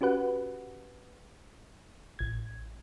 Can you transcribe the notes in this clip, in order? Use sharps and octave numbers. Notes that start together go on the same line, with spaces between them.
C#4 F#4 G4 B4 F#5
A1 G#6